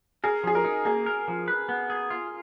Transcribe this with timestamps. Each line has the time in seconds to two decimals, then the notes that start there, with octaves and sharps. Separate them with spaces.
0.24 G#4 A#4
0.44 F3 G#4
0.55 A#4
0.64 D#4
0.85 A#3 G#4
1.06 A#4
1.28 F3
1.48 B4
1.69 B3
1.90 G#4
2.10 F4